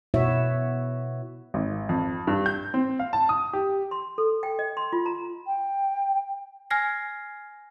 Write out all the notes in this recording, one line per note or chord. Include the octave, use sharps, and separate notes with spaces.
B2 E4 F#4 C#5 E5
G#1
F2
G2
G6
C4
F5
A5
D#6
G4
C6
A4
G5
D#5
C6
F4
A#5
G5
G#5 F6 G#6 A#6 C7